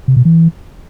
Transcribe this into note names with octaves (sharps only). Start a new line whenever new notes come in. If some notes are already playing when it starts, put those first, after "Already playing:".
C3
B2
E3